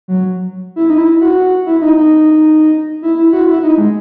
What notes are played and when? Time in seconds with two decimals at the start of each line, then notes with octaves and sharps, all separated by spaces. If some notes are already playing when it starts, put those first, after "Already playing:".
0.08 F#3
0.76 E4
0.90 D#4
0.98 E4
1.21 F#4
1.66 E4
1.82 D#4
1.97 D#4
3.02 E4
3.18 E4
3.33 F#4
3.48 E4
3.63 D#4
3.78 G#3